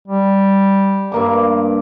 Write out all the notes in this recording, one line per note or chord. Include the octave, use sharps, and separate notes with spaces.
G3
G2 A#3 D6